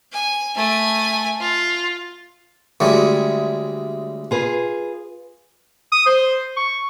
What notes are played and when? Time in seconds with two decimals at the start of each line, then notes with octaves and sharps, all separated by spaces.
0.13 G#5
0.56 A3 G#5
1.40 F4
2.80 D2 G3 G#3 C#5
4.31 F4 G#4 B4
5.92 D#6
6.06 C5
6.57 C#6